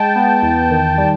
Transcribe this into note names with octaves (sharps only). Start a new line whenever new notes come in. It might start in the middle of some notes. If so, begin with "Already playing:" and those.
Already playing: G#3 G5 A5
B3
E2
D#3
G3